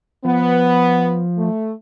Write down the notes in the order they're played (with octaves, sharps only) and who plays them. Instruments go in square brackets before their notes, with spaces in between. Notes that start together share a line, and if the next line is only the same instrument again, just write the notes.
[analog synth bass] F3 [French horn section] B3
[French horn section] A3